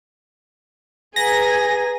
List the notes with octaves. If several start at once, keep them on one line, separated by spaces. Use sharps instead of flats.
G#4 B4 F#5 G#5 A#5 A#6